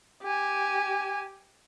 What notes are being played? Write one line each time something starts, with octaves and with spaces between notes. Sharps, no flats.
G4 G#5